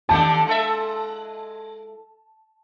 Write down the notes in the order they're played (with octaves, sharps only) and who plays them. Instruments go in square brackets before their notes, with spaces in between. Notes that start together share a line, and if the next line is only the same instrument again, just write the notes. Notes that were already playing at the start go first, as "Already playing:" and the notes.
[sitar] D3 D#3 G4 [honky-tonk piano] A5
[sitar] G#3 A4 E5